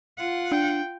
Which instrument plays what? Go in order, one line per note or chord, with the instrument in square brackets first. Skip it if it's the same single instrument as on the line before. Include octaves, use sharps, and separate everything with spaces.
[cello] F4 F#5
[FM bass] D4 [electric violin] G5